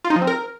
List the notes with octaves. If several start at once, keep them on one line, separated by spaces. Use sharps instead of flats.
F4
D#4
F3
C4
A#4